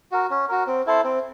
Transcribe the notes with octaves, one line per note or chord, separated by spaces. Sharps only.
F#4 A#4
C#4
F#4 A#4
C4
E4 A4 C5
C4